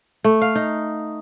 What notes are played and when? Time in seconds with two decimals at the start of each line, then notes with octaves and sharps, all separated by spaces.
0.24 A3
0.42 F5
0.55 D#4